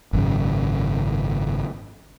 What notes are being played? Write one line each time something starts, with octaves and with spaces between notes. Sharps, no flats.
G#1 F#2 C#3